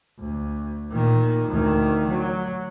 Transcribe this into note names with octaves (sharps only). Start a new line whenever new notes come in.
D2
A#2 D#3
D2 D#3
F#3